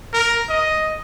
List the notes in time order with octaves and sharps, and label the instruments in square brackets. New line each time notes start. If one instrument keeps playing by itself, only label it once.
[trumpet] A#4
D#5